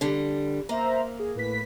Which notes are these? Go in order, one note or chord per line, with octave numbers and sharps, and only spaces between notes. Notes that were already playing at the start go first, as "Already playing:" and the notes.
D3 G3
A#3 C5 E5 A#5
G#4
A2 B4 B6